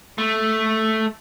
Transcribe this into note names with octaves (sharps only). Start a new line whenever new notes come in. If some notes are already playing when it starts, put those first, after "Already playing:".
A3